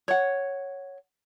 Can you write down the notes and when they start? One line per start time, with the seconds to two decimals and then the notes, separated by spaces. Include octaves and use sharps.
0.08 C#5 F#5